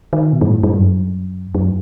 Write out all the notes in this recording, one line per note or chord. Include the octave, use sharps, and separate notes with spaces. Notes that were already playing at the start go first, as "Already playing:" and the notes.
D#3
B2
G2
A2
G2
F#2
F#2